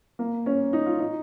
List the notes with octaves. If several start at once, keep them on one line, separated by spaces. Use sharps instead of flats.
A#3
C#4
D#4
F4
D#4